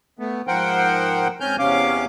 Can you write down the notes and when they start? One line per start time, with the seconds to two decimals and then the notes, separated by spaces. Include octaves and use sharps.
0.19 A3 B3
0.47 G#2 F3 A#4 C5 F#5 G5
1.40 G#2 C4 C#4 G#5 F6 G6
1.59 E2 C3 C#4 F5 D6